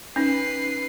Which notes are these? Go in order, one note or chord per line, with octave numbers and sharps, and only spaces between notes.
C#4 D#4 B4 C7